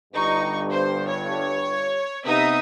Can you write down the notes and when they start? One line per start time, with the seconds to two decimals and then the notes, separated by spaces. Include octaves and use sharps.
0.14 G1 G2 D#4 C#6
0.72 C5
1.09 C#5
2.25 C3 B3 D#4 E5 D#6